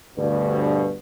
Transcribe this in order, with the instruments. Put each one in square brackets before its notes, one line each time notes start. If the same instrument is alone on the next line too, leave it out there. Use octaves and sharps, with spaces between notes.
[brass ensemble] D2 G2 B2